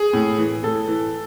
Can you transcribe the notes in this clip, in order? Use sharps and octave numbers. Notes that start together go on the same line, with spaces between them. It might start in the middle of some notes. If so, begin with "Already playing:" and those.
Already playing: G#4
A2
E3
A2 A4
E3